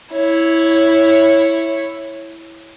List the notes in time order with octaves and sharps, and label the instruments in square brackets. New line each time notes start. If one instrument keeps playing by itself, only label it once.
[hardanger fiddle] E4 C#5